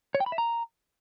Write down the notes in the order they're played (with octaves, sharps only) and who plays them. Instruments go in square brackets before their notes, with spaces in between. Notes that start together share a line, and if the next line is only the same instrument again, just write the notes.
[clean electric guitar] C#5
G5
B5
E5
A#5